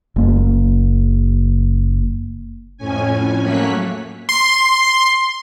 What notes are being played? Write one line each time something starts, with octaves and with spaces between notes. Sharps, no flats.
F#1 A#3
F2 A2 C#4 G#5
F#3 A3 A#3 C#5 F#6 B6
C6